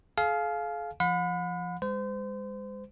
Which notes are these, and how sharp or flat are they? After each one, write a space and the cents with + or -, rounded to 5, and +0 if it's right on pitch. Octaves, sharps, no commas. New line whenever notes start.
G#4 +45 F5 +0 G#5 +45
F3 -15 F#5 -45 B5 +25
G#3 -40 C5 -35